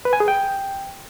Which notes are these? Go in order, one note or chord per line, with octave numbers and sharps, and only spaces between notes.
B4
G#5
G#4
G5